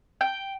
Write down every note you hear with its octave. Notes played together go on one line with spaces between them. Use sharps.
G5